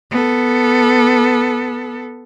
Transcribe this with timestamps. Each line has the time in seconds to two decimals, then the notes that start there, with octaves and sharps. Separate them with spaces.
0.11 B3 A4